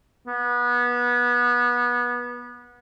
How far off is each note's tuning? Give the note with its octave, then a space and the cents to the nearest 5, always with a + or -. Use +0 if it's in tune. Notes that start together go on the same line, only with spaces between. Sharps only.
B3 -25